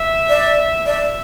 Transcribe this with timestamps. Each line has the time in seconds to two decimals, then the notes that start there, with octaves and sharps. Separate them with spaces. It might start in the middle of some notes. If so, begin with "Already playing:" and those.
Already playing: E5
0.29 D5
0.86 D5 E5